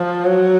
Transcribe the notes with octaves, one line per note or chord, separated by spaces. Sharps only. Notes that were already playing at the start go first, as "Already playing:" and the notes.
Already playing: F3
F#3